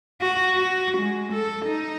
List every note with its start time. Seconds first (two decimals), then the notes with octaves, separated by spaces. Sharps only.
0.21 F#4
0.55 F#4
0.98 G#3
1.33 A4
1.66 D#4